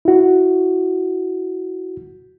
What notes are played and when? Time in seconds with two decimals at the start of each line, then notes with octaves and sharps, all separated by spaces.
0.05 E4 F#4